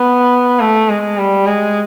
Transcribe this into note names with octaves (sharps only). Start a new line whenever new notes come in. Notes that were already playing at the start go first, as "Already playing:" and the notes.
Already playing: B3
A3
G#3
G3
G#3